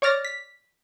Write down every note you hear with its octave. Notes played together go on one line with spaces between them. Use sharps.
C#5 D5 D6 F6 A6 A#6
B6